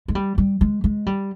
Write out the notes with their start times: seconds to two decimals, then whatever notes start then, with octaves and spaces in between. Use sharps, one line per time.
0.08 G#3
0.15 G3
0.38 G3
0.61 G#3
0.84 G#3
1.06 G3